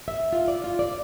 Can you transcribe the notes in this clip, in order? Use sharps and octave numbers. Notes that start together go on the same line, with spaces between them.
E5
F4
D5
F4
D5